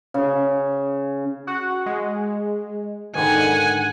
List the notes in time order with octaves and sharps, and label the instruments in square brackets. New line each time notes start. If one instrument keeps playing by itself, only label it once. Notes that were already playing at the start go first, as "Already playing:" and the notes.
[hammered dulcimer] C#3 G#4
[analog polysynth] F#4 F#5
G#3
[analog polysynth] G#2 D3 D#3 [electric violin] F#5 G#5